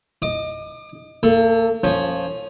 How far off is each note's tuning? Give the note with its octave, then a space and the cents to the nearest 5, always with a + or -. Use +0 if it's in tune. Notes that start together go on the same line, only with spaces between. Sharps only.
D#5 +0 D6 +35
A#3 -40 A4 +0
F3 +10 C#4 +0